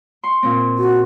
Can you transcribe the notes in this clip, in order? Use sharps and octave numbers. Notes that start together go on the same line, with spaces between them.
C6 C#6
A#2 C4
F#4